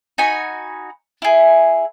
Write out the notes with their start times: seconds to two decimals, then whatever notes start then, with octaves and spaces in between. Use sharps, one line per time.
0.18 D#4 F#4 G#5 B5
1.22 E4 G#4